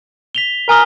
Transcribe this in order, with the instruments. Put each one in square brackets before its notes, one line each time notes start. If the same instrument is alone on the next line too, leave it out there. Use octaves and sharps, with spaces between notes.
[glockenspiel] B6 F7 G7
[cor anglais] A#4 [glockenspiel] G#5 D#6 G7